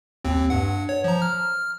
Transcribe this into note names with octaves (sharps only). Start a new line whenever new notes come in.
D#2 C4
G2 F#5
C#5
F3 A#5
F6